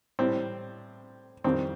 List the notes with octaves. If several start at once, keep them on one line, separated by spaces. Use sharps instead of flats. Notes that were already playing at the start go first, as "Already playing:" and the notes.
A2 G3 C4
F2 D#3 G3 C4